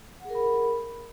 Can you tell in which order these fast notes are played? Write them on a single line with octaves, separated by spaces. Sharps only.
F#5 G#4 A#4 B5